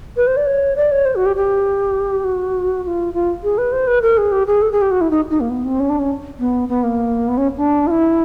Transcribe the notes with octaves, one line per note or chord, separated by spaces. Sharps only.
B4
C5
D5
C#5
D5
C#5
C5
F#4
G4
G4
F#4
F#4
F4
F4
G#4
B4
C5
B4
A#4
G#4
G4
G#4
A4
G#4
G4
F#4
E4
D#4
D#4
A#3
B3
C4
C#4
D4
C#4
B3
B3
A#3
B3
C#4
D4
F4
E4